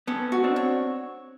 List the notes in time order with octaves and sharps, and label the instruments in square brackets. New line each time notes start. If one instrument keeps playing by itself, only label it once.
[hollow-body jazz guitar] B3 C#4 [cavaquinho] A4
[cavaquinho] F#4
[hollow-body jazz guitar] C4 D4
[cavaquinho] C#5